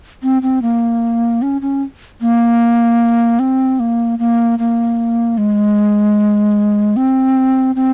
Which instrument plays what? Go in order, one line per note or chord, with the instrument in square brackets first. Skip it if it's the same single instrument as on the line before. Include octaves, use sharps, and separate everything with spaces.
[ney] C4
C4
A#3
C#4
C#4
A#3
C4
A#3
A#3
A#3
G#3
C4
C4